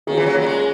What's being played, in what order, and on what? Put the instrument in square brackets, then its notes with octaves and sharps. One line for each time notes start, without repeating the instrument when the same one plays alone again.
[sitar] D#3 [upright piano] A#3 C#4 F4 G#4
[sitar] E3
F#3
G3
G#3